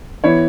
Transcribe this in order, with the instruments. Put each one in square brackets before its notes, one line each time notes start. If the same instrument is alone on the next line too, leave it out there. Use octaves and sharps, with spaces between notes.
[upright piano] E3 B3 E4 C#5